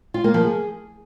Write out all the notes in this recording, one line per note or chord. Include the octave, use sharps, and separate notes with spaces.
F4
A#3
F3
G#4